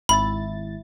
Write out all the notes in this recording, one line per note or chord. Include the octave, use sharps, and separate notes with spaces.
G#1 E4 B5 A6